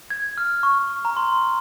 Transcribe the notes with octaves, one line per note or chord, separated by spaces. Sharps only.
G#6
F6
C#6
A#5
C6